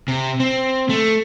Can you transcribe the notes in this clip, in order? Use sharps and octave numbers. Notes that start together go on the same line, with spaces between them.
C3
C4
A3